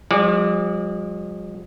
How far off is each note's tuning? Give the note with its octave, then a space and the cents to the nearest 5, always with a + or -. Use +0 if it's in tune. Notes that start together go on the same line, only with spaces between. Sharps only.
F3 +35 G#3 -40 D5 +0